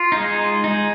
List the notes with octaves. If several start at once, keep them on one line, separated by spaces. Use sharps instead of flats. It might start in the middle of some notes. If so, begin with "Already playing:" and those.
Already playing: F4
G#3 D#4
G#3 D#4